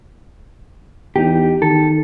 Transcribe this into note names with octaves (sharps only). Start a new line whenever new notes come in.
E2 D#4 G4
D#3 A4